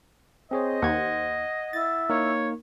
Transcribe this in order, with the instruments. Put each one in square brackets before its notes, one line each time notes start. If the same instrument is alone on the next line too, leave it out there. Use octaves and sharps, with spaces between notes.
[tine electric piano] C4 G#4 C#5 [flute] C5 [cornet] D#5
[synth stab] D#2 [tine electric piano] F#5 G#6
[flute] E4 [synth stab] A6
[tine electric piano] A#3 D#4 A#4 [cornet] C#5